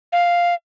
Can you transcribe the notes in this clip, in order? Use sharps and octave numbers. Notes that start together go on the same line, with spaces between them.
F5